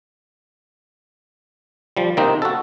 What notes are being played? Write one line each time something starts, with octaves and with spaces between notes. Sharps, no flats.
F3 G3
C3 D#3 A#3 C4 D#4
F#4 A4